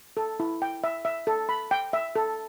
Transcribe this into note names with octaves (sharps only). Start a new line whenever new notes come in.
A4
E4
G5
E5
E5
A4
B5
G5
E5
A4